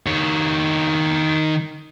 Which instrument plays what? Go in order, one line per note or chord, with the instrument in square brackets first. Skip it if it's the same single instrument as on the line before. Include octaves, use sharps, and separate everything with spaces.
[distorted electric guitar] D#3 C#5